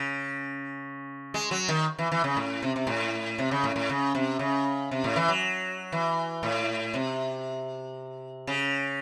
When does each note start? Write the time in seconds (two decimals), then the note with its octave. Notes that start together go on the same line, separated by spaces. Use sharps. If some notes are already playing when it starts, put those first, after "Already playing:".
Already playing: C#3
1.34 G#3
1.51 F#3
1.68 D#3
1.99 E3
2.12 E3
2.24 C#3
2.37 A2
2.62 C3
2.76 C3
2.87 A2
3.38 C3
3.51 C#3
3.64 A2
3.76 A2
3.90 C#3
4.15 C3
4.39 C#3
4.91 C3
5.04 A2
5.16 E3
5.28 F#3
5.92 E3
6.43 A2
6.94 C3
8.47 C#3